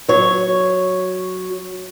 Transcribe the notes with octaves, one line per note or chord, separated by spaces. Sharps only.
F#3 C#5